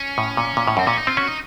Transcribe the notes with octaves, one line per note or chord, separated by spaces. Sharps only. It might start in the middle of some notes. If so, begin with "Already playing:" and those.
Already playing: C#4
A2
A#2
A#2
A2
F#2 C4
A#2 C#4
D#4
C4 F4
C#4 F#4
D#4